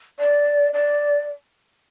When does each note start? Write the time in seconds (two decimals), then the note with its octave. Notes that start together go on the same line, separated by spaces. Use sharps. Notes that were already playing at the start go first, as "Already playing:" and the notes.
0.19 D5
0.73 D5